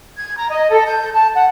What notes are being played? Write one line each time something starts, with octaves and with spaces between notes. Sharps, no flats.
G#6
A#5
D#5
A4
G6
A5
F#5